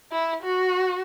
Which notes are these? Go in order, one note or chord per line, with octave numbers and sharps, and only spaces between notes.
E4
F#4